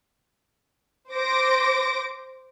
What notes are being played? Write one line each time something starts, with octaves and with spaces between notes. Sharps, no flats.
C5 D6 A#6 D7